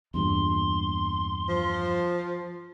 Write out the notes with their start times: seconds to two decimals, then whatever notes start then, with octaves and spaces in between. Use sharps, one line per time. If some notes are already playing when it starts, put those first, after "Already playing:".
0.14 E2 G2 A#2 C6
1.49 F3